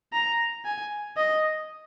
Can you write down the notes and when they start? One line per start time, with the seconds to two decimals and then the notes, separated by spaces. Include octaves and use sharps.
0.13 A#5
0.64 G#5
1.17 D#5